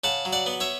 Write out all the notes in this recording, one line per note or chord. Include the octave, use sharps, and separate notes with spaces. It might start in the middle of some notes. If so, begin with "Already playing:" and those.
C#3 F#5 A5
F#3
D5 F#5
B3
C#5 E5